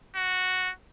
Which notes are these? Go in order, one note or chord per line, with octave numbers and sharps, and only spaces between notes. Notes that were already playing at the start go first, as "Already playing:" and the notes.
F#4